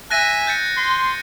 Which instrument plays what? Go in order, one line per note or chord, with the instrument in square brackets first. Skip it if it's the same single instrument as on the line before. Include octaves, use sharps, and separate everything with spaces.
[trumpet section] E5 G#5 [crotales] F#6 A#6 D#7
[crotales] G6 A6 C#7
[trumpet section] C6